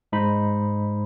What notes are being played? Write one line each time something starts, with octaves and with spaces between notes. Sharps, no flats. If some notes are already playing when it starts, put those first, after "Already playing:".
G#2 G#3 D#4 C5 B5